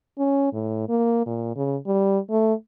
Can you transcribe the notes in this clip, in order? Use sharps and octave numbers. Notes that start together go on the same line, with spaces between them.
C#4
A2
A#3
A#2
C#3
G3
A3